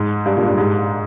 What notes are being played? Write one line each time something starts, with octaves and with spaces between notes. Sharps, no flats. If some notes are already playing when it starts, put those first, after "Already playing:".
Already playing: G#2
G2
G2 A#2
G2
G#2